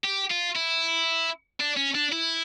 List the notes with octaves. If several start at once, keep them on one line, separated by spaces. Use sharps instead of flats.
G4
F4
E4
D4
C#4
D4
E4